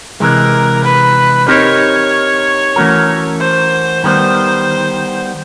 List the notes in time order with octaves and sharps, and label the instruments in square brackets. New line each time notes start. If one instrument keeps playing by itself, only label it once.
[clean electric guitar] C3 E3 G#3 [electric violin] A#4
[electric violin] B4
[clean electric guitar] C4 D#4 G4 A#4 D#5 [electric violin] C#5
[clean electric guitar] E3 A3 C#4 F#4 A#4
[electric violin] C5
[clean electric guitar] D#3 G3 B3 [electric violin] C5